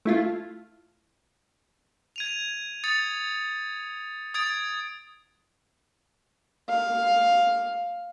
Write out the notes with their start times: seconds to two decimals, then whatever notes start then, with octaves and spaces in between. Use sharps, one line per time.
0.05 A3 E4 F4
2.16 G#6 D#7 F7
2.84 D#6 G#6 A6 C#7
4.34 D#6 G#6 A6 D7
6.69 F5